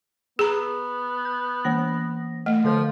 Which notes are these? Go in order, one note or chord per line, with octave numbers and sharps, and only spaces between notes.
B3 G#4 A#5
G6
E3 A#3 A#6
A3 D#5
D3 F3 A4 G6